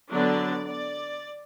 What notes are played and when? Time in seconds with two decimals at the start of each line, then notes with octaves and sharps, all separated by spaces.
0.11 D3 F#3 B3 D4 D5
0.67 D5